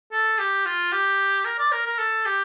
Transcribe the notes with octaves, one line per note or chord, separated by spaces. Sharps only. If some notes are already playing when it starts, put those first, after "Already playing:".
A4
G4
F4
G4
A#4
D5
A#4
A#4
A4
G4